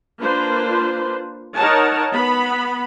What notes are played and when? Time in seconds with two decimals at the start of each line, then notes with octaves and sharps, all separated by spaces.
0.21 A#3 D4 F4 B4 C5
1.55 D#4 A#4 C#5 F#5 A5
2.14 B3 B5